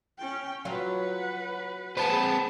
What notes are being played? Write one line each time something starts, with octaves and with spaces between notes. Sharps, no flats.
C#4 G5
F#3 F4 B4 F#5
C4 G#4 B4 A5